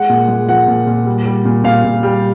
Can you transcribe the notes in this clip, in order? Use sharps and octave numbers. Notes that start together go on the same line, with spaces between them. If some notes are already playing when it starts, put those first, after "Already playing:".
Already playing: G#3 F#5
A#2
G#3
F3 F#5
A#2
A#2
G3
G3
A#2
A#2 F5
A#2
G3